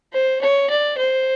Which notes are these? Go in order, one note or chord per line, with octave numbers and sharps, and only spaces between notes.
C5
C#5
D5
C5